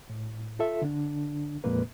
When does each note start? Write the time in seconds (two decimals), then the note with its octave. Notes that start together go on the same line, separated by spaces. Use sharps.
0.10 A2
0.59 F4 A4 E5
0.82 D3 D4
1.64 F2 A#2 G#3 A#3 B4